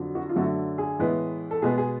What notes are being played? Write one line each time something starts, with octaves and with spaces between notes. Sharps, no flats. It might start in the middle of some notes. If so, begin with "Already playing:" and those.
Already playing: F2 D3 F#3
F#4
F4
F#2 D3 F#3 A3 F#4
G#4
A2 E3 G#3 B3
A4
B2 G#3 B3 G#4
G#4